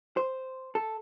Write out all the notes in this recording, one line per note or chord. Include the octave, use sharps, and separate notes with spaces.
C5
A4